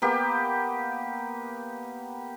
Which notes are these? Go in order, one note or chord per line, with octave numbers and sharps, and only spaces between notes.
A#3 B3 G4